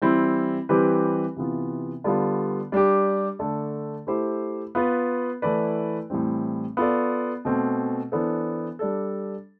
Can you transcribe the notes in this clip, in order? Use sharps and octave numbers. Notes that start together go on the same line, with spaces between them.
E3 G3 C4 E4
E3 G3 C4 G4 B4
C3 E3 B3 F4
D3 G3 B3 F4
G3 D4 G4
D3 A3 D4 A4
A3 E4 G4 C5
B3 F4 B4
E3 A3 E4 B4 D5
A2 E3 G3 C4
B3 F4 A4 D5
B2 A3 C4
E3 B3 D4 A4 C5
G3 D4 A4